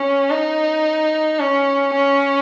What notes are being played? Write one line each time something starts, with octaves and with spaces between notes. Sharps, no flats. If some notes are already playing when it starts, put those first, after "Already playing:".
Already playing: C#4
D#4
C#4
C#4